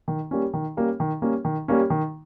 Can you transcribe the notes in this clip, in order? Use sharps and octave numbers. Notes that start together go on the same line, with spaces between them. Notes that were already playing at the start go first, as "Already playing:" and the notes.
D#3
G3 A#3 C#4
D#3
G3 A#3 C#4
D#3
G3 A#3 C#4
D#3
G3 A#3 C#4
D#3